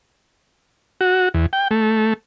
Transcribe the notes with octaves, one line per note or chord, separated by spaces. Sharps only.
F#4
E2
G5
A3